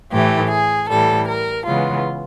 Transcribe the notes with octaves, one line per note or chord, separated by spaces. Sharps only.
A2 E3 A3 G4
G#4
A2 E3 G3 A4
A#4
C#3 E3 G#3 B3 F4